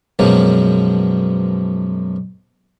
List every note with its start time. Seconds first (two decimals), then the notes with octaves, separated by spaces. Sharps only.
0.19 F#2 B2 F3 F#3 G#3 A#3